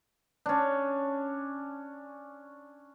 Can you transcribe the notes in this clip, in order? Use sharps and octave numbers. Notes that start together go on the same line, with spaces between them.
C#4 D4